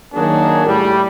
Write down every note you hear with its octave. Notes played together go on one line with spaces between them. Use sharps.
D#3 F#3 A#3 D4 F#4 G#4
A2 G3